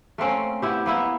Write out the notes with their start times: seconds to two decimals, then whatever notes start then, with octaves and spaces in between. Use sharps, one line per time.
0.18 A3 A#3 C4 C#4
0.62 B3 E4 G4
0.86 A#3 B3 E4